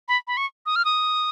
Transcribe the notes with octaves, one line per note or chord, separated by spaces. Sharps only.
B5
B5
C#6
D#6
F6
D#6